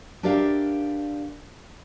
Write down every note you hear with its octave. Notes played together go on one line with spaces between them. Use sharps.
D4 G4 A#4 D5 E5 F5